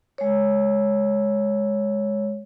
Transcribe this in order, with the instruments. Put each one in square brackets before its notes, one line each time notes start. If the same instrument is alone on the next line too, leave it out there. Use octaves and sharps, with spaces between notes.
[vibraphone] G#3 C#5